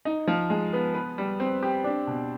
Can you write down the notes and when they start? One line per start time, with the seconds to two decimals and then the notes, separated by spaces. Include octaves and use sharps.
0.05 D#4
0.27 F3
0.50 G#3
0.73 B3
0.95 B4
1.18 G3
1.40 C4
1.63 G4
1.84 D4
2.07 B2